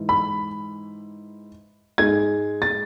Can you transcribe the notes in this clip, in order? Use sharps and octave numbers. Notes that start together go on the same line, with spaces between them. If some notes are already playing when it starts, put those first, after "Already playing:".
Already playing: G#2 E3
B5
G#2 G#3 G#6
A6